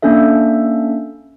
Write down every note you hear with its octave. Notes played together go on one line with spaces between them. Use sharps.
A#3 C#4 D4 A4 E5